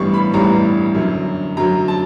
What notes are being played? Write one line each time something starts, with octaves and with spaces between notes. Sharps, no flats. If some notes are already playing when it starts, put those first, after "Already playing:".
Already playing: A1 G2 E3 G3 B3 C#6
B5
A1 G2 E3 G3 B3 A#5
F#2 D3 F#3
F#2 D3 F#3 A#5
A5